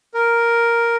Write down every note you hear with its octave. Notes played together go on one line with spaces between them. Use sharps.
A#4